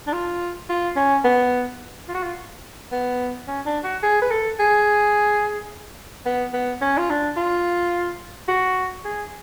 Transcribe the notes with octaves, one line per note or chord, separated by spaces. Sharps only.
D4
F4
F4
C#4
B3
F4
F#4
F4
B3
C#4
D4
F#4
G#4
B4
A4
G#4
B3
B3
C#4
F4
D4
F4
F#4
G#4